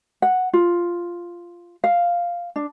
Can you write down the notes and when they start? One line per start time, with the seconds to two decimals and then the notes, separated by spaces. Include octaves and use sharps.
0.22 F#5
0.53 F4
1.84 F5
2.56 D4